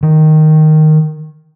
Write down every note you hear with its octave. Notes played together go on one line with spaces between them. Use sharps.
D#3